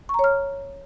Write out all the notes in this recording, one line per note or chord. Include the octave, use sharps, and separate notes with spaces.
C#5 A#5 C#6 F6